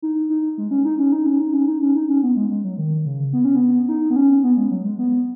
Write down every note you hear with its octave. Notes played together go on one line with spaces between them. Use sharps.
D#4
D#4
G#3
C#4
D#4
C#4
D#4
C#4
D#4
C#4
D#4
C#4
D#4
C#4
B3
G#3
G#3
F#3
D#3
C#3
B3
C#4
B3
D#4
B3
C#4
B3
G#3
F#3
G#3
B3